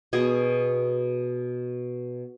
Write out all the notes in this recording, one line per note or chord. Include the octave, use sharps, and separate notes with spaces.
B2 G#4